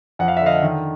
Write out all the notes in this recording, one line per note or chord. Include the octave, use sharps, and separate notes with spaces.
F2 F#5
F5
E5
D3
D#5 F5
D#3